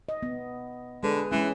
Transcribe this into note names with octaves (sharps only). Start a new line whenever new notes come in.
D#5
B3
D3 G#3 G#4 B4
E3 G#3 C#4